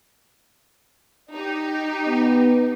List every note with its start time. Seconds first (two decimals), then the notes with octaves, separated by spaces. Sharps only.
1.33 D#4 G4
2.07 B3